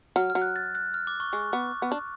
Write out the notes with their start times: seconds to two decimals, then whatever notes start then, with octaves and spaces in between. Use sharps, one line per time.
0.16 F#3 F6
0.30 F6
0.35 F#3
0.42 F#6
0.56 A6
0.75 F#6
0.94 F6
1.07 D6
1.20 C#6
1.33 G#3 C#6
1.53 B3 D6
1.82 B3
1.92 D4